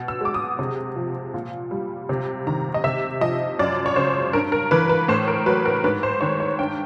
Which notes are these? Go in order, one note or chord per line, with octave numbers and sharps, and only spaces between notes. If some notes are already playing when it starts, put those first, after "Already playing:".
Already playing: B2
E6
G#3 D6
D#6
C3
F3
A#2
G3
C3
D#3 A#5
D#5
C3 E5
F3 D#5
F#2 D5
C#5
C#3 C5
G2 A#4
A#4
E3 B4
B4
A2 C5
A#4
F#3 B4
A#4
G#2 B4
C5
D#3 C#5
C#5
G2 G5